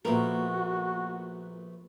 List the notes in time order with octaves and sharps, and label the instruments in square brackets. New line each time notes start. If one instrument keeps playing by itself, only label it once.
[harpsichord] A#1 A3 B3 [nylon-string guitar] A#2 A#4 [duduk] F#4